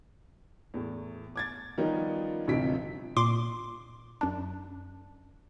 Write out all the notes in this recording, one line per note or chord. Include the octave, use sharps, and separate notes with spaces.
E2 A2
D6 G#6 A6
D#3 F3 G3 B3 C#4 D#4
A1 D2 C3 F3 B6 D7
A#2 C6 D6
F#2 D4